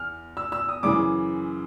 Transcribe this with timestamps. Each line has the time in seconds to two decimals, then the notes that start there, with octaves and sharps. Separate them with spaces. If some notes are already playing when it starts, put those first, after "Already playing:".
Already playing: E2 F6
0.37 E6
0.52 E6
0.69 D#6
0.83 F#2 C#3 E3 D6